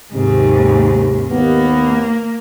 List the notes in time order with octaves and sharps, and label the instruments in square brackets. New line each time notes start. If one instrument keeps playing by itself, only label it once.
[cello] D#2 G#2 [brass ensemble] C3 D#3
[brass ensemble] D#2 B3 [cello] A#3